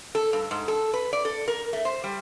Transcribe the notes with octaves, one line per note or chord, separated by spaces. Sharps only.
A4
G2
G#2
A4
B4
D5
A4
A#4
A3
C5
G3